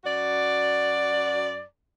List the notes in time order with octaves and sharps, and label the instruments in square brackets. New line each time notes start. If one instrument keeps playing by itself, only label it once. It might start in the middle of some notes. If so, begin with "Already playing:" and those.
[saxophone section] F#2 F#4 D5